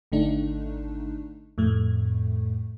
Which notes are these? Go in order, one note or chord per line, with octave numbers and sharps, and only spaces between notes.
G#1 D3 A3 D4 D#4
F2 A2 A3